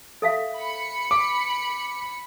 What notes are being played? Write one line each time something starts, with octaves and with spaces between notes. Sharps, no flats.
A4 E5 F5
B5 C#7
D6